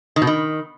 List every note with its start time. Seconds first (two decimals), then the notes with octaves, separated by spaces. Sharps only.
0.16 D#3
0.22 B2
0.27 D#3